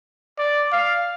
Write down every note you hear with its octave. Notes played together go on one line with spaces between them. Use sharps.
D5
F5